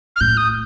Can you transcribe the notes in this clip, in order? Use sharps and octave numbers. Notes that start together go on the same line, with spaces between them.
F6
A2 G6
D#6